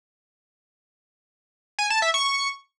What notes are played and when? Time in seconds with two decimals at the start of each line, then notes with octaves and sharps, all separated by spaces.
1.79 G#5
1.90 A5
2.02 E5
2.14 C#6